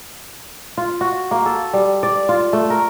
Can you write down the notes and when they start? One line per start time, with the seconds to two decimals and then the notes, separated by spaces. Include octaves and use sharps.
0.78 F4
1.01 F#4
1.31 A#3
1.46 A4
1.73 G3
2.03 D5
2.29 F4
2.53 A3
2.70 A#4